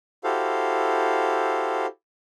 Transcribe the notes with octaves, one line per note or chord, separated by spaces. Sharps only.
E4 F#4 G4 A4 C5 F5